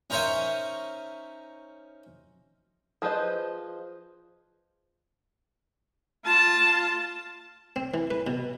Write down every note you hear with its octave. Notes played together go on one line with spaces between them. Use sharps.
C#4 D#4 A#4 C5 C#5 E5
F3 G#4 B4 C5 D#5
F4 A5
C4
E3
B4
B2